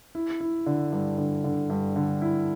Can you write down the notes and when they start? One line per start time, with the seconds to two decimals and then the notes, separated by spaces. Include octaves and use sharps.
0.15 E4
0.40 E4
0.66 D3
0.92 G2
1.18 D3
1.44 D3
1.70 G2
1.96 D3
2.22 E4